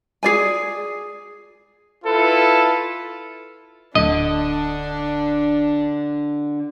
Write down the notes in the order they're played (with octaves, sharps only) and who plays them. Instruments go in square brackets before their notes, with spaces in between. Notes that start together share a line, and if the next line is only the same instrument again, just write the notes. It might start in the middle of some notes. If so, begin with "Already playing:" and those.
[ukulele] G#4 D5 G#5
[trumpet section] E4 F4 A4 B4
[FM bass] D1 [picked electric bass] D3 [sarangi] D4 [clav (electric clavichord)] D#5